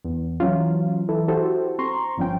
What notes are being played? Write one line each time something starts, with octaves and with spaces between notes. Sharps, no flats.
E2
E3 F#3 C#4 F4
E3 A4
E4 F#4 G4 A4 C5
C4 A#5 C6 C#6
G1 F3 C#4 G5